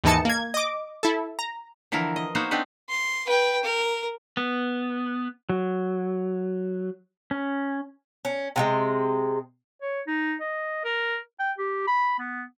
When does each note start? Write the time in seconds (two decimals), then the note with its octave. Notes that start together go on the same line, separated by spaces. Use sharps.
0.04 D#2 G#2 E3 D#4 A5 C#7
0.25 A#3 G#6
0.54 D#5 D6
1.03 E4 A4
1.39 A#5
1.92 D3 E3 F3 E4 A#4
2.16 D#5
2.35 A#3 B3 D#4 F#4 C5
2.51 B3 C4 D4 D#4 B4
2.89 C6
3.26 B4 G5
3.63 A#4
4.37 B3
5.50 F#3
7.31 C#4
8.25 C#4
8.56 C3 E3 G#3
9.82 C#5
10.07 D#4
10.41 D#5
10.84 A#4
11.39 G5
11.58 G4
11.87 B5
12.19 B3